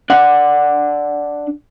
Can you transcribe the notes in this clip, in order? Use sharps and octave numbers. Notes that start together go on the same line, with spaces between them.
D4 F#5